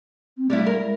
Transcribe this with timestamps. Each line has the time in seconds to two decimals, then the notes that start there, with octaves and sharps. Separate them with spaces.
0.37 C4
0.50 G3 A3 D4 E4
0.67 A#4
0.82 G#3